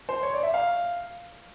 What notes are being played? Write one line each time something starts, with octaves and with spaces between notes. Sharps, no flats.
C5
C#5
D5
E5
F5